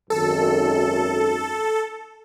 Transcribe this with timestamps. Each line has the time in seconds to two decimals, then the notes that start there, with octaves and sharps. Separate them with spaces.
0.10 G#1 F#2 D#3 A4